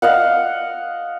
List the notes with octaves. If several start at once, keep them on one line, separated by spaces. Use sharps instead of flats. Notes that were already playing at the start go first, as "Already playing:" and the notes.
D#5 F5 F#5